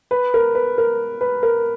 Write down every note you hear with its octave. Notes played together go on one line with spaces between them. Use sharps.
B4
A#4
B4
A#4
B4
A#4